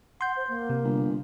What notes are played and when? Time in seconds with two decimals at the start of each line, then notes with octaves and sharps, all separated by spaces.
0.21 F#5 C6 G6
0.37 C5
0.48 A#3
0.70 C3
0.84 G1